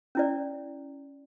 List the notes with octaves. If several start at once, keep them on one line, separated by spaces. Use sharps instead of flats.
C#4 E4 D5